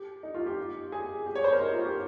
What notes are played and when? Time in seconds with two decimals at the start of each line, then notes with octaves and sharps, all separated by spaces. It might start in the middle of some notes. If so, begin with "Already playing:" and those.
Already playing: G4
0.23 D#4
0.34 F4
0.46 G4
0.92 G#4
1.26 G4
1.35 C#5
1.44 C5
1.52 A#4
1.61 D#4
1.73 F4
1.85 G4